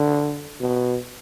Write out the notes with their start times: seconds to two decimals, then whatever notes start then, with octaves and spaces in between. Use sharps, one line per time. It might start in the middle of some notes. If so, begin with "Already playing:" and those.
Already playing: D3
0.60 B2